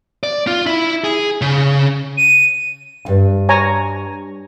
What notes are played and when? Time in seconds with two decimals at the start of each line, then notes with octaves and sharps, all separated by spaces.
0.23 D5
0.47 F4
0.66 E4
1.04 G#4
1.42 C#3
2.17 D#7
3.05 D2 G2
3.49 C#5 G#5 A#5